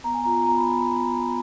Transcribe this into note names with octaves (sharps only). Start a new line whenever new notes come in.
B3 A#5
G#5
F4 A#5
B3 A#5
B5
F4
B5
B3
F4